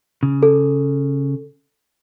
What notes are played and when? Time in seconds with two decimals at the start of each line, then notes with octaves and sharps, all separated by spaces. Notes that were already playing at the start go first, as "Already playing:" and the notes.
0.23 C#3
0.43 A4